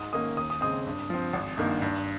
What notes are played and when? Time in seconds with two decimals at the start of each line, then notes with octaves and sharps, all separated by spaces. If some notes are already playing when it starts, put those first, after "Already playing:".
Already playing: G#2 D#6
0.13 D#3 A#3 C#4 D#6
0.37 D#2 D#6
0.50 D#6
0.61 C#3 G#3 C4 D#6
0.86 G2
1.10 F3 C4
1.33 G#1
1.58 G2 D#3 A#3
1.82 G2